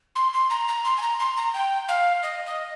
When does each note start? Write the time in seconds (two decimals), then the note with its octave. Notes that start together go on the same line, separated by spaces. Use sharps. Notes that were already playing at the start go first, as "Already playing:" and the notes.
0.16 C6
0.33 C6
0.50 A#5
0.68 A#5
0.84 C6
0.98 G#5
1.02 A#5
1.19 C6
1.37 A#5
1.54 G5
1.88 F5
2.23 D#5
2.46 D#5